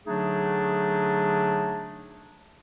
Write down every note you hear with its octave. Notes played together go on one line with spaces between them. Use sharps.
D3 F#3 A3 D4 D#4 G#4